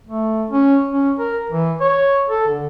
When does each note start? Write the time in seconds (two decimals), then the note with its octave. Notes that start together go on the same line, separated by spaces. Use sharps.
0.07 A3
0.50 C#4
0.91 C#4
1.19 A#4
1.50 E3
1.81 C#5
2.30 A4
2.48 D3